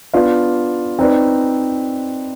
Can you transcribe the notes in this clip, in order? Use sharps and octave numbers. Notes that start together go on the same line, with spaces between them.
B3 D4 F4 B4 F5
C4 D#4 B4 D5